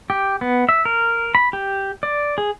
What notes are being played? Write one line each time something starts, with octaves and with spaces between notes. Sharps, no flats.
G4
B3
E5
A#4
B5
G4
D5
G#4